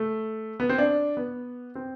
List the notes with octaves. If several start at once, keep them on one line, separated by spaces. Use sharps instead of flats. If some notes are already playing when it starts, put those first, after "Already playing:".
Already playing: A3
B3
C4
D4
B3
C4